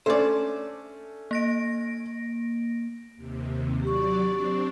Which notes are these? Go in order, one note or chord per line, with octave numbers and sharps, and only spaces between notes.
A3 C#4 D4 C5 D5
A#3 A#6 D7
D#2 C3
F#3 G4 D5 C#6
C4 D4